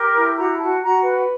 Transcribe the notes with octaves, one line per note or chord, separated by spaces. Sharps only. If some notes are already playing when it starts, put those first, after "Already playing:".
Already playing: G4 A#4
E4
F#4 A#5
F#4 A5
F#4 A#5
B4